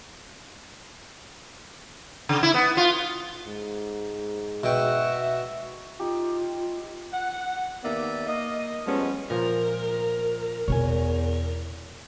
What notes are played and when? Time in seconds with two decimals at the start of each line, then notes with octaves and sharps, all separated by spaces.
2.29 C#3
2.43 E4
2.54 B3
2.77 F4
3.47 G#2
4.63 B2 F#4 E5 G5
6.00 D#4 F4 G4
7.13 F#5
7.84 D#2 A#3 B3 D5 E5
8.27 A#3 D#5
8.87 F3 G3 G#3 B3 C#4
9.30 A#2 F3 A#4
10.68 E2 B2 E4 C#5 G#5